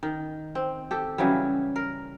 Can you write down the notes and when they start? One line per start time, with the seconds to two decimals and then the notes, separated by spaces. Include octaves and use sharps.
0.03 D#3
0.55 C4
0.91 G4 A4
1.18 C#3 E3 F#3 G3
1.76 A#4